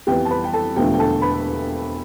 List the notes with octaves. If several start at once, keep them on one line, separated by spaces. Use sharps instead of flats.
F2 E3 B3 G4 G5
A5
B4 B5
G5
A4 A5
E1 E2 D3 F3 A3 G4 G5
G5
A4 A5
B4 B5